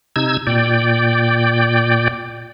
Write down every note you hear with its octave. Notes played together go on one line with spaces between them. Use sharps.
C3 D#4 E6 G#6
A#2 D5 G5